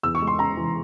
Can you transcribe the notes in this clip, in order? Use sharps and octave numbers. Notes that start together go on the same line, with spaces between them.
E2 E6
C#6
G#3
C6
C#3 A#5
E3